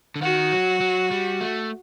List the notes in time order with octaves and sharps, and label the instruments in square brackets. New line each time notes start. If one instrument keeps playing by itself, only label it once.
[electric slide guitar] D3
[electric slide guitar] D#3 [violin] F#4
[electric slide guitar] F#3
F#3
G3
A3